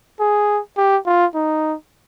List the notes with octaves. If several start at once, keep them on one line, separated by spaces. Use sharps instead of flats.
G#4
G4
F4
D#4